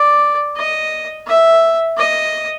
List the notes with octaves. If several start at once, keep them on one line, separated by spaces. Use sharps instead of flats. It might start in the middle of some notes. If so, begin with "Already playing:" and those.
Already playing: D5
D#5
E5
D#5